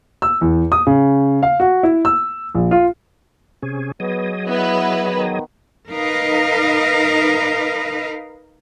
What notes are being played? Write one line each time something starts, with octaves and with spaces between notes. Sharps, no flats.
E6
E2
D#6
C#3
F5
F#4
E4
E6
A#1
F4
C3 C#4 G#4
F#3 B3 G#4 D#5
B3 E4 B4
D#3
D#4 A#4 B4 D#5 F5